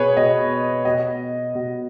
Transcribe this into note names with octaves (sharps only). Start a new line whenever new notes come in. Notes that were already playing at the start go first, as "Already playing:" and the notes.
Already playing: B2 G#4 B4 C#5
B2 D#5
B2 D#5
B2